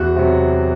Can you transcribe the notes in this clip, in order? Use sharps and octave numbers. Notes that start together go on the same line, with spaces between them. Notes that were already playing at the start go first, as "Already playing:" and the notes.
Already playing: E2 F#4
C3 F#3